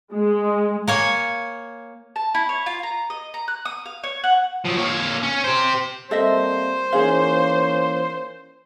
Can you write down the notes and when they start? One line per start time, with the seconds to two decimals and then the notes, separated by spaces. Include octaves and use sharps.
0.12 G#3
0.88 A#3 C#5 G#5
2.16 A5
2.35 E4
2.49 C#5
2.66 F4
2.83 A#5
3.10 D#5
3.34 A#5
3.48 F#6
3.65 D#6
3.86 F5
4.04 C#5
4.24 F#5
4.65 F3 F#3
4.78 A#3 C#5
5.23 C#4
5.44 G4 C5
6.11 G3 A#3 C4 A4 C5 D#5 E5
6.93 E3 A#3 C#4 D#4 G#4 F5